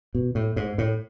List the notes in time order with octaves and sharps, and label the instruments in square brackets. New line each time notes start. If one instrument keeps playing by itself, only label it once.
[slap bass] B2
A2
G#2
A2